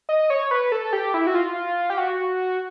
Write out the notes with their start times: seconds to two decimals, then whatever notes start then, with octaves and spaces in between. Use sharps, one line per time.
0.09 D#5
0.30 C#5
0.51 B4
0.72 A4
0.93 G4
1.14 E4
1.27 F#4
1.35 F4
1.90 G4
1.98 F#4